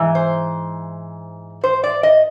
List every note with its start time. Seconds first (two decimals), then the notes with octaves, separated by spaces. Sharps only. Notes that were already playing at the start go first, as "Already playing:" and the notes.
Already playing: G#2 E3
0.15 C5
1.64 C5
1.84 D5
2.03 D#5